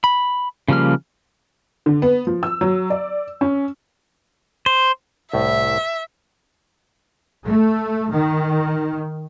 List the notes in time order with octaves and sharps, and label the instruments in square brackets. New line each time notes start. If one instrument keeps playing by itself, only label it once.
[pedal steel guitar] B5
C#3 F3 G3 A#3 F6
[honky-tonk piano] D3
B3
F3
E6
F#3
D5
C#4
[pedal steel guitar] C5
[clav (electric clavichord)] C2 A2 [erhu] E5
[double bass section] A3
D#3